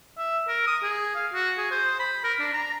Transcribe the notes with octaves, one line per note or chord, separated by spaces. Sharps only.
E5
A#4
D#6
G#4
F5
F#4
G#4
C5
B5
A#4
D4
A#5